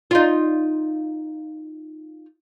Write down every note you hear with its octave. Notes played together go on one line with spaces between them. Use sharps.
D#4 F4